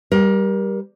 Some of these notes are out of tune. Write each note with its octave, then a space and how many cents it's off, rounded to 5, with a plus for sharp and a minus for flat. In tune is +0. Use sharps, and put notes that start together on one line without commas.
G3 +0 A#4 +25